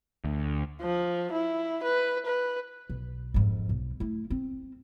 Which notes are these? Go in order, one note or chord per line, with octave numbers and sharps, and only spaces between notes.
D2
F3
E4
B4
B4
B1
F2 G#2
B1
A3 E4
C4